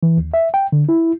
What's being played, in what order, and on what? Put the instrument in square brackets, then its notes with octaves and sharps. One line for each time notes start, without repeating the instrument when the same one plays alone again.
[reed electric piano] E3
D#2
E5
G5
D3
E4